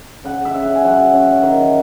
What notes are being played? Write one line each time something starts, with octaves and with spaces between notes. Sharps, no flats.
C#3 F#5
E5
C#3
F#5
G#5
F#3 F#5
C#4
D#3